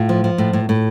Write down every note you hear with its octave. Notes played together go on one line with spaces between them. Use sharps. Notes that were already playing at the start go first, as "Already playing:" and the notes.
Already playing: A2 F4
F3
F3
A2
A2
A2